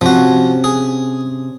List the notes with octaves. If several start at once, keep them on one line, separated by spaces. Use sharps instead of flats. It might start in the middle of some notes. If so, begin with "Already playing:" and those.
C3 F3 C#4 F#4
G#4